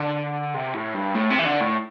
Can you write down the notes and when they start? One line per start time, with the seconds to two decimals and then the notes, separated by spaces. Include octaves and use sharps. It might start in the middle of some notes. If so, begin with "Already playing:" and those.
Already playing: D3
0.54 C3
0.74 A2
0.94 G2
1.15 A2
1.30 C3
1.39 E3
1.45 D3
1.61 A2